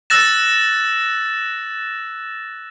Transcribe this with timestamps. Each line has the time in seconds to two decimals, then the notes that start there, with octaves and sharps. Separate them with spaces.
0.10 E6 F#6 A6 A#6 E7